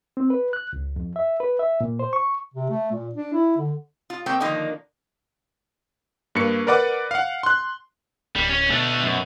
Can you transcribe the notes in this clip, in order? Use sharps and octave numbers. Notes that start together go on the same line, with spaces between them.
C4
B4
F#6
C#2
F2
E5
B4
E5
A#2
C5
C#6
C3
A3
A#2
D4
E4
D3
F4
A3 A#3 C4 G5
D3 D#3 F3 A#3
G2 A#3 C#7
A#4 B4 D5 F#5 D6
F5 F#5
C6 F#6
D1 G3
C#4
B2 A3 D4
F#2